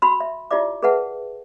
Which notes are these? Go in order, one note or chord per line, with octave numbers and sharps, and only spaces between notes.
F#4 B5 C6 E6
E5
E4 F4 G4 D5 E5 D6
G#4 A#4 B4 E5 F#5 A5